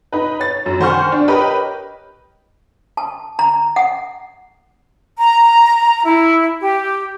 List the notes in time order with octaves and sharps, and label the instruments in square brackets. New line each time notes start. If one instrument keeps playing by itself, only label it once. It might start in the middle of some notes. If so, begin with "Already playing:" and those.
[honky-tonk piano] D#4 B4
C#5 A6
F#2
D#3 C5 F#5 G#5 C#6 F6
D4
G4 A#4 B4 C#5 D#5 G5
[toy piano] A5
A#5
F#5
[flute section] A#5
E4
G4